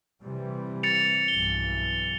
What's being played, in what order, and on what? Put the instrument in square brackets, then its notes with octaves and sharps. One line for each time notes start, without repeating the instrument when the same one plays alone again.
[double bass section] C3 E3 G3
[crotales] A6 C#7 F7
[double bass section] B1 G2 E3 [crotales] G7